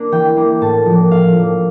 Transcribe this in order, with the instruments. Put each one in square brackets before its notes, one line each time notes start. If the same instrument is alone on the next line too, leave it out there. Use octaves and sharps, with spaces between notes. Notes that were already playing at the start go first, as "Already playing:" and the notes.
Already playing: [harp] A#3 D4
E3 G5
A#3 D4
A2 A5
F3
A#3
A2 F5
F3 A#3